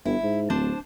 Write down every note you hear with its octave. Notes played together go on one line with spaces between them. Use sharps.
G1 E4
G#2
D1 D4 C5 A5